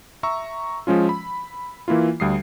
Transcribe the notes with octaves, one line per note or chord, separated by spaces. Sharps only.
E5 A#5 C#6 E6
F3 G#3 C#4 F4
B5
E3 A#3 E4 F4
D2 G3 D#6 C7